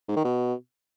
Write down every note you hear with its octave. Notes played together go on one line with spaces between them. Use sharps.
G#2
D#3
B2